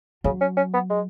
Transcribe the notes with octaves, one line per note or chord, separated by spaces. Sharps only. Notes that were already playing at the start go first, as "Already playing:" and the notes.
C#3 F#3
C#4
C#4
B3
G#3